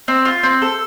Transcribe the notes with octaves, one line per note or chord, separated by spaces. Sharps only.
C4
F4
C4
A4